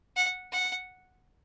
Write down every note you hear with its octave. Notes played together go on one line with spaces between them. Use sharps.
F#5
F#5